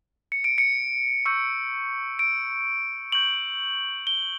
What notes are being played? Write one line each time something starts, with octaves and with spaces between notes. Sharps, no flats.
C#7
D7
C#7
C#6 E6 G6 C#7
D7
C#6 G6 F#7
G7